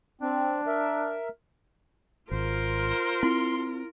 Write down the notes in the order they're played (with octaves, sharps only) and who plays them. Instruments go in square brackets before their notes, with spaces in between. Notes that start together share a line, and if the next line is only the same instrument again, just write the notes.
[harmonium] C4 [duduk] D4
[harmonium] A#4 E5
[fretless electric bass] G#1 [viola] F4 A#4 [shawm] C5
[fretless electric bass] C4 [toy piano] E4 [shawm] C6